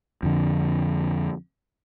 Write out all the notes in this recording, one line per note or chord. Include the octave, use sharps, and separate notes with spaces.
F2 D3